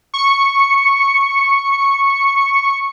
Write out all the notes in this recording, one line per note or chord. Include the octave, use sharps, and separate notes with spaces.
C#6 C#7